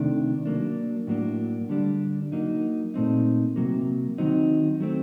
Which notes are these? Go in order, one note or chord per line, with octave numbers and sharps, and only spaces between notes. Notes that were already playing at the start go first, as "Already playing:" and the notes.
Already playing: C3 D#3 A3 D4
F#3 A#3 D4
A2 F#3 A#3 D4
D3 G3 D4
F#3 A#3 D#4
A#2 A3 C4 D#4
C3 F#3 A#3
D#3 F#3 C4 D#4
F#3 A3 C4